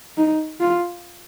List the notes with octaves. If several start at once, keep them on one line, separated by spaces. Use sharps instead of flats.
D#4
F4